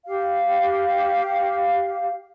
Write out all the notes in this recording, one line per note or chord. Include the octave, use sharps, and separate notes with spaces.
G4 F5